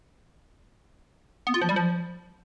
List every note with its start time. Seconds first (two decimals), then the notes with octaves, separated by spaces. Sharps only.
1.47 B3
1.54 F4
1.61 F3
1.69 G3
1.76 F3